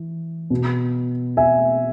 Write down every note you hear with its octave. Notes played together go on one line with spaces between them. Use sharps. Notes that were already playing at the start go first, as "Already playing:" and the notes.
Already playing: E3
B2
E5 G#5